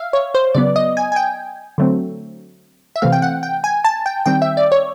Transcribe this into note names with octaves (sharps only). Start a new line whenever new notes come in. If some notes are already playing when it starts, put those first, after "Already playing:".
Already playing: E5 F5
C#5
C5
C#3 F#3 B3 D5
D#5
G#5
G#5
G5
D3 F#3 A3 C4
E5
C3 E3 A3 C4 F5
G5
F#5
G5
G#5
A5
G5
D#3 G3 C4 G5
E5
D5
C#5